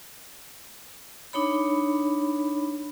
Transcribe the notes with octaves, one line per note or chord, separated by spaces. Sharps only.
D4 D#4 C#5 B5